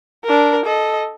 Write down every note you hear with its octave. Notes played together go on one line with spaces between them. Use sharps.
D4 A#4
A4 D#5